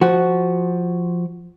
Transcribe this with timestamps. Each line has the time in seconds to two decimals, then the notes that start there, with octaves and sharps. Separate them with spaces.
0.01 F3 F#4